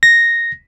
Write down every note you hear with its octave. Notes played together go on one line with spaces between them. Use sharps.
A#6